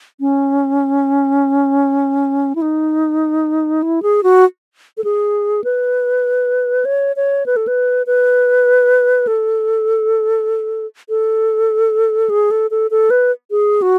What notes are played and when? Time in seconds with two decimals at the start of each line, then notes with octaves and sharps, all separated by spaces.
0.20 C#4
2.55 E4
2.62 D#4
3.83 E4
4.03 G#4
4.23 F#4
4.97 A4
5.04 G#4
5.64 B4
6.85 C#5
7.16 C#5
7.46 B4
7.56 A4
7.68 B4
8.07 B4
9.27 A4
11.09 A4
12.30 G#4
12.51 A4
12.71 A4
12.91 A4
13.10 B4
13.51 G#4
13.82 F#4